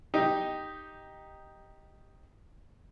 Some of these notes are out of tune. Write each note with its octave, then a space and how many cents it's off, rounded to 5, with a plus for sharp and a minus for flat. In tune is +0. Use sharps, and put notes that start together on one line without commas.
D#4 +0 G4 +0